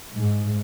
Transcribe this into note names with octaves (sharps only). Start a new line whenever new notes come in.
G#2